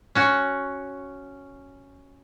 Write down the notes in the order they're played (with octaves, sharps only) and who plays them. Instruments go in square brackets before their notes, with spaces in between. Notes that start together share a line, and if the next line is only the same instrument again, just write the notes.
[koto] C#4 F#4